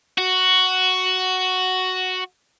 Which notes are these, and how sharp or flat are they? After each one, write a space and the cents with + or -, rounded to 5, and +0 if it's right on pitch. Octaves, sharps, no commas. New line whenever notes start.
F#4 +5